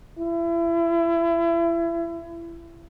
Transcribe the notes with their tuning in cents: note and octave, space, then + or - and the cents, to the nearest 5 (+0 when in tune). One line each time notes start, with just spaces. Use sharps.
E4 +30